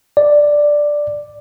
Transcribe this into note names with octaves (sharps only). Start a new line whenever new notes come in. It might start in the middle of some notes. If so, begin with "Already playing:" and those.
D5